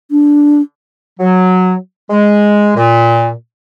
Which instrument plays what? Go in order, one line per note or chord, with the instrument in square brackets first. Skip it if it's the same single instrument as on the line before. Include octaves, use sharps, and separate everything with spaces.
[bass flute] D4
[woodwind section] F#3
G#3
A#2